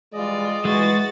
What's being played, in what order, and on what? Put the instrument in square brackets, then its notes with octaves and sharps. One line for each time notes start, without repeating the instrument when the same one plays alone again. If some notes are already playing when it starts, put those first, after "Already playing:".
[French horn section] E3 G3 G#3 [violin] F4 D5 [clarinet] D#5
[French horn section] E3 [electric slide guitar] G#3 [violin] F#4 A6